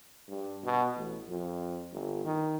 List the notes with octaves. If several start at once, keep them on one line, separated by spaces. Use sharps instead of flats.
G2
B2
A1
F2
G1
D#3